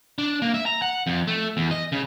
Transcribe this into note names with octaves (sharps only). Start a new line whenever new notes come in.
D4
A#3
E5
A#5
F#5
F2
A3
E2
D#5
C#3